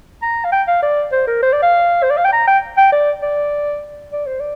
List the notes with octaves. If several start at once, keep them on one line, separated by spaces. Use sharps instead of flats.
A#5
F5
G5
F5
D5
C5
A#4
C5
D5
F5
C5
D5
F5
G5
A#5
G5
G5
D5
D5
D5
C5
D5